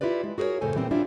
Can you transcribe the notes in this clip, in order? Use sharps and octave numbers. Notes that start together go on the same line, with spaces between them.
E4 F4 G4 B4 D5
G#3
F#4 G#4 A#4 B4 C#5
F2 A2 C#3 A4 C5 G#5
A#2 E3 G3 B3 C4
E3 G3 C4 D4 E4 F4